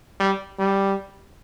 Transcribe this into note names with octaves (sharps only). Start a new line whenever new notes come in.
G3
G3